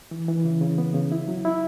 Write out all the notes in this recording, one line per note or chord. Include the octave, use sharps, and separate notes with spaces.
E3
E3
C#3
C#3
B3
C#3
E4
F#3
E4